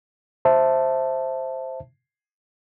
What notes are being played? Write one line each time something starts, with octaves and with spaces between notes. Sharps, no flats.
C5 E5 A5